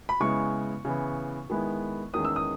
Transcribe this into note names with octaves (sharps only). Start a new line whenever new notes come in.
B5
C#3 G#3 B3 E4 C#6
C#3 E3 B3 E4
D#3 G#3 B3 E4
E2 D#3 G#3 C#4 D#6
E6
D#6